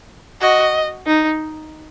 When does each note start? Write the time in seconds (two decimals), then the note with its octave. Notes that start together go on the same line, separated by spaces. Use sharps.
0.41 F#4 D#5
1.07 D#4